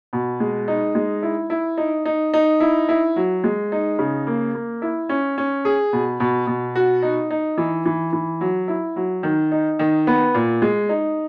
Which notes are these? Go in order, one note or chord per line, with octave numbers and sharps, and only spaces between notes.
B2
G#3
D#4
G#3
E4
E4
D#4
D#4
D#4
E4
E4
F#3
G#3
D#4
C#3
A#3
A#3
E4
C#4
C#4
G#4
B2
B2
B2
F#4
D#4
D#4
E3
E3
E3
F#3
E4
F#3
D#3
D#4
D#3
B3
A#2
G#3
D#4